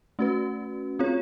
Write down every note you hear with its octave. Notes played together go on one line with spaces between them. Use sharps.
A3 C#4 F#4 B4
C4 F4 G#4 C#5